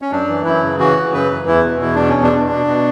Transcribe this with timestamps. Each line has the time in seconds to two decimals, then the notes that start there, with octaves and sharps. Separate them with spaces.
0.02 C#4
0.12 F#2 D4
0.28 E3
0.45 F#2 E4
0.62 C#3
0.80 E3 F#4
0.97 C#3
1.13 F#2 B4
1.31 E3
1.48 E2 E4
1.64 B2
1.81 E2 E4
1.95 B2 D4
2.09 C#4
2.15 E2
2.23 D4
2.32 B2
2.50 B2
2.67 B2